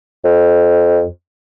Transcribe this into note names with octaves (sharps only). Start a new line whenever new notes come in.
F2